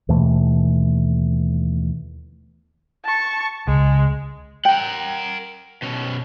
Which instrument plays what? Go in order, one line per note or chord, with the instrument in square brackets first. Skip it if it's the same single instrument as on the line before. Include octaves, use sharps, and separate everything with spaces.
[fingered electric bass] D#2 B2 E3 A3
[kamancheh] A5 C#6
[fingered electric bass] C#2 [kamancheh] G#3
[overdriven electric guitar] A#4 F#5 [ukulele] G5
[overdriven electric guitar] B2 C#4